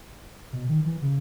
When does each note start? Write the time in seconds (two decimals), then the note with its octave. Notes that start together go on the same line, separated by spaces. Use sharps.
0.53 B2
0.69 D#3
0.85 E3
1.02 C#3